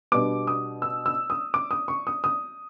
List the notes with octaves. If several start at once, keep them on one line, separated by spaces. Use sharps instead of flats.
B2 G3 B3 D4 D6
D#6
E6
E6
D#6
D6
D#6
C#6
D#6
D#6